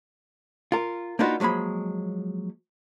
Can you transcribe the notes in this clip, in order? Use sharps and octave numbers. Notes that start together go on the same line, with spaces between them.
F4 A#4
A#3 D4 D#4 F4 F#4 B4
F3 F#3 G#3 A#3 B5